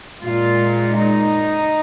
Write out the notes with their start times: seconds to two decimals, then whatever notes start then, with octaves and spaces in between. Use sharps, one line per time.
0.23 A#2 G#3 F4
0.97 D#4